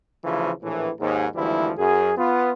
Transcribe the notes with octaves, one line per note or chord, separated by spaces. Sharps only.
D2 C#3 E3 F3
A#1 A2 E3
D#2 G#2
G#1 D2 E3 F3 G3 E4
F#2 G#4
B3 F4